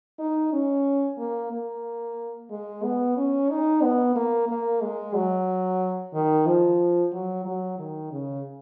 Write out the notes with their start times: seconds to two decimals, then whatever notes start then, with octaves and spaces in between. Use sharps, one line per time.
0.19 D#4
0.53 C#4
1.19 A#3
1.52 A#3
2.50 G#3
2.84 B3
3.17 C#4
3.50 D#4
3.82 B3
4.16 A#3
4.49 A#3
4.82 G#3
5.15 F#3
6.14 D#3
6.47 F3
7.13 F#3
7.45 F#3
7.79 D#3
8.12 C#3